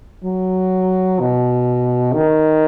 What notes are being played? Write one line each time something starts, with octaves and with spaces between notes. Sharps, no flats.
F#3
B2
D#3